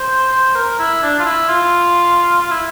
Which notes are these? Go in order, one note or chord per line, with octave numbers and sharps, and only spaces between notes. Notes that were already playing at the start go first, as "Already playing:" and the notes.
Already playing: C5
C5
A#4
E4
D4
F4
E4
F4
F4
E4